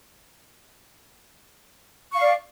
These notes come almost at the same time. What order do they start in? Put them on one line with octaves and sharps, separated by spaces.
C#6 F5 D5